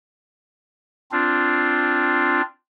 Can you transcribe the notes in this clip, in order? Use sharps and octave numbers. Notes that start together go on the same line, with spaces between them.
C4 D4 F4